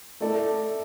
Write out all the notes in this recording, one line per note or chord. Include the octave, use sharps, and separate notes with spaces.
A3 E4 A4 D5